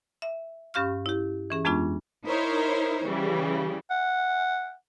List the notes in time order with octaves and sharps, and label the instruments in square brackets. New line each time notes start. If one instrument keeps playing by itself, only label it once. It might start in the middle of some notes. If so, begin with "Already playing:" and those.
[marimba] E5
G2 C#4 G4 F5 C#6 F6
E4 G4
E3 C#4 G#4
F2 G#3 B3 D4 F4 C#6
[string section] D#4 E4 A#4 C5 C#5
C#3 E3 G3
[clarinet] F#5